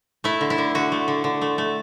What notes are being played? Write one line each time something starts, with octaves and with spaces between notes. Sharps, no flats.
A3 E4
D3
E4
D3
D3 F#4
A3
D3
D3
A3
A3